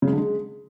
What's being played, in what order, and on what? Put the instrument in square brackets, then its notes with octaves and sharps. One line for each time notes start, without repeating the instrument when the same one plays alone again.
[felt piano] C#3
G#3
D3
G#3